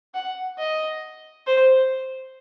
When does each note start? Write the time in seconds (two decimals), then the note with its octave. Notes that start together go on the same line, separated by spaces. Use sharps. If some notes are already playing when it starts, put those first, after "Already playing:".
0.14 F#5
0.59 D#5
1.46 C5